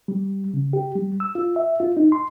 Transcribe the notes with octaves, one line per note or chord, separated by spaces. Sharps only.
G3
C#3
G4
G3
E6
F4
E5
F4
D#4
C6